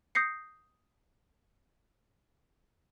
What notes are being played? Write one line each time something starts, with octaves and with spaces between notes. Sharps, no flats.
D#6 G6 A#6 C7 C#7